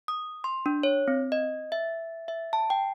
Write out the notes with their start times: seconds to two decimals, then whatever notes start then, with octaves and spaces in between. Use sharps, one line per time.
0.08 D#6
0.44 C6
0.66 D4
0.83 C#5
1.08 C4
1.32 D#5
1.72 E5
2.28 E5
2.53 A5
2.70 G5